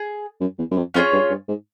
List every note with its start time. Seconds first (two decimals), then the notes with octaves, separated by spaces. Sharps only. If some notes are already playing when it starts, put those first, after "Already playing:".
Already playing: G#4
0.41 F#2
0.58 E2
0.71 F#2
0.77 F2
0.94 F2 C#4 F4 G#4 C#5
1.13 G2
1.30 G2
1.48 G#2